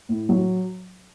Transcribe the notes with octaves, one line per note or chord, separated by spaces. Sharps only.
A2
F#3